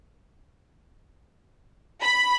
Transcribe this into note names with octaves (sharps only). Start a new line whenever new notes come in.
B5